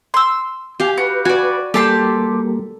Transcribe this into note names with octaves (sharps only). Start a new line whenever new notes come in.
C6 E6
G4 F5 G#5
F#4 B4
F#4 D5 G#5
G3 A#3 G4 A4 A5 C6